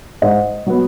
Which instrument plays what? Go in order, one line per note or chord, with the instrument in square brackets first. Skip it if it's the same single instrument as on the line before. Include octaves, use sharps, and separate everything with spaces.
[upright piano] G#2 D#5
F#3 B3